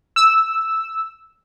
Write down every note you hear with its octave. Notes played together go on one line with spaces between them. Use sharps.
E6